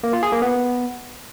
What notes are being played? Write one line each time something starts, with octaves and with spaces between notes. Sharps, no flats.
A#3
F4
G#4
A#3
B3